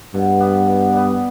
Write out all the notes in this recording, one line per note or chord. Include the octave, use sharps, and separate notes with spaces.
G2 B2
G3 B3
B2
G3 B3